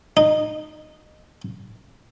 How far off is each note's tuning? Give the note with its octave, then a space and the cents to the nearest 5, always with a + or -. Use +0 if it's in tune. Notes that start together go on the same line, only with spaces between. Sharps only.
D#4 -15